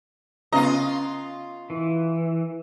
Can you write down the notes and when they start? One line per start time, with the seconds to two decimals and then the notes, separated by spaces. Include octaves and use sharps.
0.53 C#3 B3 F4 D#5 A#5
1.70 E3